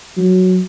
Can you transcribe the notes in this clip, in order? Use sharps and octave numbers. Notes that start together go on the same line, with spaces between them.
F#3